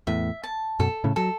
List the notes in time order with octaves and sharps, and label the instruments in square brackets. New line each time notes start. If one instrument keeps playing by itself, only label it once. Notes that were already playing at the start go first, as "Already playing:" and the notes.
[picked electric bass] E2 A2 [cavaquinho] E5
[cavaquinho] A5
[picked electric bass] F#2 B2 [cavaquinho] A4
[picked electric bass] A2 C#3
[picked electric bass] F#3 [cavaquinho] A4